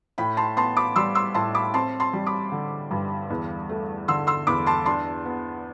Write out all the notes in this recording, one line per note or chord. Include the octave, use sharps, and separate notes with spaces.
A2 G5 B5
A5 C6
B3 A5 C6
B5 D6
G3 C6 E6
C6 E6
A2 A5 C6
B5 D6
C4 A5 C6
A5 C6
G3
B5 D6
D3
G2
E2
A3
D3 C6 E6
C6 E6
E2 B5 D6
A5 C6
D4 A5 C6
B3